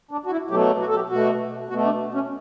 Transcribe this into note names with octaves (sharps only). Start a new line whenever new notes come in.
D4
F#4
E4
B2 F#3 A3 G4
F#4
A4
G4
B2 A3 F#4
B2 A3 F#4
D4
C#4